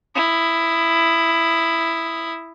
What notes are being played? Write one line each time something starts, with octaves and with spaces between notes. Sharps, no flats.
E4 D#6